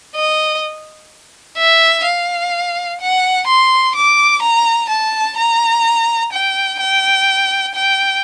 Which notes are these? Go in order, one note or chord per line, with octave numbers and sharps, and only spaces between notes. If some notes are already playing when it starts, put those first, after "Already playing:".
D#5
E5
F5
F#5
C6
D6
A#5
A5
A#5
G5
G5
G5